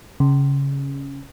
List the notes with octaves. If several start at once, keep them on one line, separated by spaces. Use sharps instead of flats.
C#3